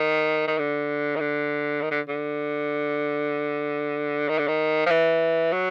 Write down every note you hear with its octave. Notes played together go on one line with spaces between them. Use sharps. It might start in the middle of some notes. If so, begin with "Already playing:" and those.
Already playing: D#3
D#3
D3
D#3
D3
D#3
D3
D3
D#3
D3
D#3
F3
E3
F#3